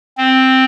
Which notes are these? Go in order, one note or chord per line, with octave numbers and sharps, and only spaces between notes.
C4